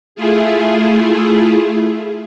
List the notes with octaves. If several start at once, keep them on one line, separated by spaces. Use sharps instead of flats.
A3 E4 F4 G#4